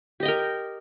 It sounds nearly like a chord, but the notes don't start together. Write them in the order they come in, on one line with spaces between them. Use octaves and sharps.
G4 D#5 G5 A#4